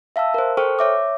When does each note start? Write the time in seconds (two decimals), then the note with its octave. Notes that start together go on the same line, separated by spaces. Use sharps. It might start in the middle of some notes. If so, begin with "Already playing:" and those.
0.16 E5 F5 A5 E6
0.34 A#4 C5
0.57 A4 C5 G5 C#6 F6
0.79 C#5 E5 D6